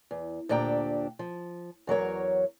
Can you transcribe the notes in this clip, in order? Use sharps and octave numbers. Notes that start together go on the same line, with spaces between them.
E2
D2 A#2 D4 G4 G5 A#5
F3
E2 F#3 A#4 C#5